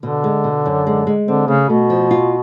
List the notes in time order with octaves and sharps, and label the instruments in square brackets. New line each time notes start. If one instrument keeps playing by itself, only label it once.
[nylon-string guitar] B2 [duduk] D3
[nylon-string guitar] G#3
B2
F#2
G#3
G#3
[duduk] D3 [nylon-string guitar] C4
[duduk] C#3 [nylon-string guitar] A3
[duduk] B2 [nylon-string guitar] A3
[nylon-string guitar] F3
F4